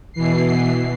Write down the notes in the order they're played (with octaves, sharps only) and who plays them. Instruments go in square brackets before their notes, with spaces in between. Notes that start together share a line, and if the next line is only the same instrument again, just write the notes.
[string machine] B2 E3 C7